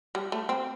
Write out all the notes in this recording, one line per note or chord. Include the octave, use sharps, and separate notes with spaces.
G3
A3
C4